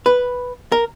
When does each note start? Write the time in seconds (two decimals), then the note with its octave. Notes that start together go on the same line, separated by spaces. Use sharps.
0.06 B4
0.72 A#4